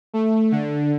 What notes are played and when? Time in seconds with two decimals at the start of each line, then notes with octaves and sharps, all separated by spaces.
0.14 A3
0.52 D3